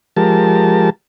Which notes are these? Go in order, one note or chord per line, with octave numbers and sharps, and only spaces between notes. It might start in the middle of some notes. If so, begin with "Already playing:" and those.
F3 G#3 G4 A#4 A5